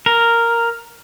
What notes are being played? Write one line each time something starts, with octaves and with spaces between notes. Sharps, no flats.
A#4